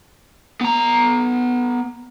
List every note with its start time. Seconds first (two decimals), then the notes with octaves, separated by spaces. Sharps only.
0.61 B3 A#5